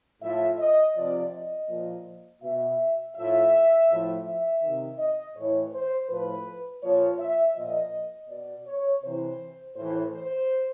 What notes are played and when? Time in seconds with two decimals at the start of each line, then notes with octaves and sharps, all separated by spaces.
0.22 A2 F3 E5
0.59 D#5
0.96 C3 F3 D5
1.33 D#5
1.69 A#2 F3
2.42 B2 E5
3.16 A2 F3 E5
3.90 A2 F3
4.26 E5
4.62 C3 D#3
4.99 D#5
5.36 A2 E3 C#5
5.73 C5
6.09 A2 F3 B4
6.82 A#2 F3 C#5
7.19 E5
7.56 A#2 F3 D#5
8.29 B2 D5
8.67 C#5
9.03 C3 E3 C5
9.76 A2 C5
9.82 E3
10.14 C5